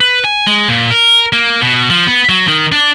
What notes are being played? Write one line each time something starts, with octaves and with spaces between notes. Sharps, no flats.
B4
G#5
G#3
A#2
A#4
A#3
B2
F3
B3
F#3
D#3
D4